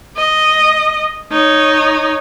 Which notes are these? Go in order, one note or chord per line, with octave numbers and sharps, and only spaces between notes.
D#5
D#4 C#5